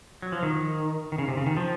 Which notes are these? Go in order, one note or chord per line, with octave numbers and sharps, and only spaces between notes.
F#3
F3
D#3
D#3
C#3
C3
C#3
D#3
F3